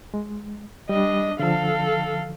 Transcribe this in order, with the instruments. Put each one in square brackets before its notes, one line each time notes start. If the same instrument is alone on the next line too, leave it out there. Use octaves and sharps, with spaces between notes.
[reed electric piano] G#3
[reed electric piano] G3 [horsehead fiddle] D4 D#5
[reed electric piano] D3 F3 [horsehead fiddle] A4 F5